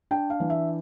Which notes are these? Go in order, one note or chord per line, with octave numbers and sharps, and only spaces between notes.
D4 G5
F5
E3
E5